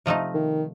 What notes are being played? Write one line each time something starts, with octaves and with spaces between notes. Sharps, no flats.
C3 F3 A3 D#4
D#3